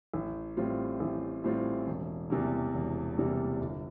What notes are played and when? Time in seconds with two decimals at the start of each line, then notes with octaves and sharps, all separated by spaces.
0.14 A1
0.57 A2 G3 C4 F4
1.00 A1
1.44 A2 G3 C4 F4
1.87 E1
2.30 E2 C3 G3 A#3
2.74 E1
3.17 E2 C3 G3 A#3
3.61 G1